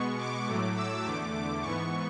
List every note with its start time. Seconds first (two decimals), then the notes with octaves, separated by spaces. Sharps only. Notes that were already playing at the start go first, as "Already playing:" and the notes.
Already playing: B2 G#3 B3 C#6
0.18 D6
0.47 A2 F#3 A3
0.76 E6
1.04 E2 D3 A3 D6
1.33 D6
1.62 G#2 E3 B3 C#6